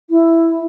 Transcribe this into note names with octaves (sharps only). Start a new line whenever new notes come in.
E4